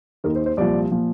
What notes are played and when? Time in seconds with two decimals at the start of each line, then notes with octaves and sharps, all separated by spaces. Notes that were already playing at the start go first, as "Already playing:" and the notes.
0.24 D#2 D#3 A#4
0.36 C5
0.46 C5
0.57 C2 A#2 F3 D5
0.91 A#2 F3